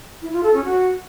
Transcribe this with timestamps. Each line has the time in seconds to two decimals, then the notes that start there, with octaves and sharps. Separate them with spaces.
0.22 E4
0.33 F4
0.43 A4
0.54 C#4
0.65 F#4